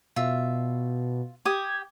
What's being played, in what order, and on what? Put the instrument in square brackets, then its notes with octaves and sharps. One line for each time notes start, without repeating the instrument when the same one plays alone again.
[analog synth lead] B2 [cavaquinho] F4 E5
[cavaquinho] G4 D#6 [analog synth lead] G#6